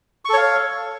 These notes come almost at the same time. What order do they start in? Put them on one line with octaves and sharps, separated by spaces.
C#6 A4 C#5 F5